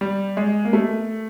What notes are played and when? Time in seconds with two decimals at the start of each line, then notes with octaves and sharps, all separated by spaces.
0.01 G3
0.37 G#3
0.65 A#3
0.73 A3